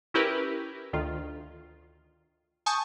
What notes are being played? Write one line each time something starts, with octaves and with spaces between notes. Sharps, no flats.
C#4 E4 G4 A#4 B4
D2 D#3 F4
G#5 A5 C#6 D#6 G6